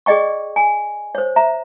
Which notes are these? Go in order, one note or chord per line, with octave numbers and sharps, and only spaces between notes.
G#4 D5 D#5 G5 C#6
G#5
C5 C#5
E5 A#5